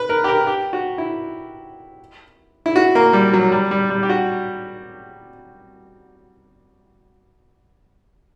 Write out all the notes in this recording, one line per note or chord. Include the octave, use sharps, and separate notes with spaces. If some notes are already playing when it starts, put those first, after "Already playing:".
Already playing: B4
A#4
G4
A#4
G4
F#4
E4
E4
F#4
A#3
G3
F#3
G3
G3
G3
G4
F#4